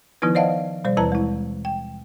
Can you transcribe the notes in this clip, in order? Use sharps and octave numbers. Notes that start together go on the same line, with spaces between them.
D#3 F3 B3 D#4 E4 B4
C5 D5 D#5 F5 F#5 A5
B2 G3 C5 D5
D#2 E3 E4 B4 A5 A#5
G#3 E4
G5